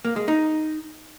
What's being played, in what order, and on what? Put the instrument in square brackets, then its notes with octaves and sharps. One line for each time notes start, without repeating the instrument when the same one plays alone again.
[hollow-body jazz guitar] A#3
G#3
D#4